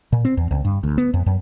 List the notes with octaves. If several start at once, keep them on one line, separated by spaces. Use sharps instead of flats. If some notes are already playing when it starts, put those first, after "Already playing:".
A#2
C4
E2
C#2
G2
D2
B3
F2
F#2